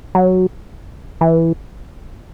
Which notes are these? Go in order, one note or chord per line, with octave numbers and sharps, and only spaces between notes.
F#3
E3